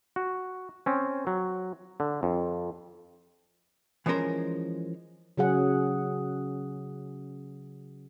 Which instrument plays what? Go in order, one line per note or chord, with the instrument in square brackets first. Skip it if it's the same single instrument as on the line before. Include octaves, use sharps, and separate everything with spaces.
[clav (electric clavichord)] F#4
C4 C#4
F#3
D3
F2
[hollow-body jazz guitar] E3 F3 G#3 C#4 A#4 C5
[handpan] C#3 F#3 G#4 F#5